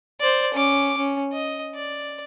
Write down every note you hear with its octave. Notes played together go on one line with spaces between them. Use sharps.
C5 D5
C#4 D6
C#4
D#5
D5